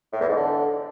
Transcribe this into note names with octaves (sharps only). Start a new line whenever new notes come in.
A2
E2
G#2
D3